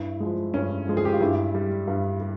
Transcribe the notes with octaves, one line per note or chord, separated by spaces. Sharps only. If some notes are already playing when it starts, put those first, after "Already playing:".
Already playing: G2 E4
F3 G#3
G2 C#4
F3 G#3
G#4
G4
F4
G2 E4
G3
G2
G3